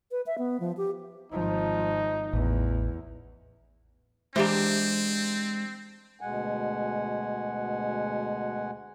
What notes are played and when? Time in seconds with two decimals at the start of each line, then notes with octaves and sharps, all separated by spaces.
0.11 B4
0.26 E5
0.38 B3
0.60 F3
0.77 G4
1.32 G#1 F3 D#4
2.33 A1 E2
4.36 E3 G#3 A#3 C4 D4 G4 C5
6.21 D2 B2 G#3 F#5 G#5